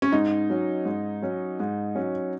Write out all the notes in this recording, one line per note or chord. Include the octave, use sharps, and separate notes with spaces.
C#4
G#2 D#4
F#3 C#4
G#2
F#3 C#4
G#2
F#3 C#4